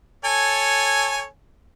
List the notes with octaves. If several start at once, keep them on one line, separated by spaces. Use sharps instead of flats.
A4 C#5 G#5